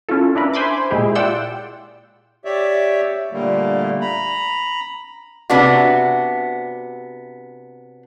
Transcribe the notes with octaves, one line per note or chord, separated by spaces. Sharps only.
C#4 E4 F4 A4
D4 E4 A#4 B4
C5 G#5 B5 C6 D6
A#2 G#3 E4 G4 G#4
F4 D5 F#5 G5 E6
G4 C#5 D5 E5
A#2 D3 G3 A3 A#3
A#5 B5
C3 B3 D4 F#4